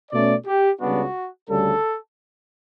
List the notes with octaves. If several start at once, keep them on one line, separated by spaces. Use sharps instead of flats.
B2 A3 C#4 D5
G4
C#2 C#3 G3 B3 D4 F#4
D2 C#3 G3 A4